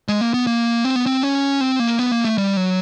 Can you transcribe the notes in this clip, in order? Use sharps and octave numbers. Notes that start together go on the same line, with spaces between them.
G#3
A#3
B3
A#3
C4
B3
C4
C#4
C4
A#3
B3
A#3
A3
G3
F#3